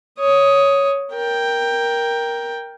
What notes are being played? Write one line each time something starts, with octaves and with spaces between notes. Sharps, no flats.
C#5 D#6
A#4 G5